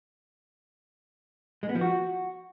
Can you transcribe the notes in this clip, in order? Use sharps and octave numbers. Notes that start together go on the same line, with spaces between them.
G#3
B3
F3
F#4